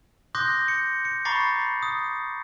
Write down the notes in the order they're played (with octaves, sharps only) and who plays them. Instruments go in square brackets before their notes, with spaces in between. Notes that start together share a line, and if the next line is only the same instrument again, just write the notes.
[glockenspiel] C6 D6 D#6 F#6 G6 A#6
C#7
C#7
A#5 B5 C#6 D6 A6 C7
D#6